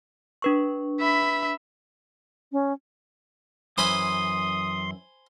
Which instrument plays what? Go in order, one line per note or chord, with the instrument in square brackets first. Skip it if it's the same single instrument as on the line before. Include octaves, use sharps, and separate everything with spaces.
[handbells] D4 B4 C#6
[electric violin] E5 B5
[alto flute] C#4
[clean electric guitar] F#2 E3 [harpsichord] C5 G#5 B5 [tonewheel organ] C6 [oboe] D#6